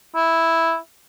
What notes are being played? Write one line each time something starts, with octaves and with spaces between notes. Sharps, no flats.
E4